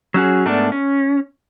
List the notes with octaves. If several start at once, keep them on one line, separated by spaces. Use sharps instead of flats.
F#3 C#4 F#4 G#4
G#2 A3 B3 D4 A#4 D5
C#4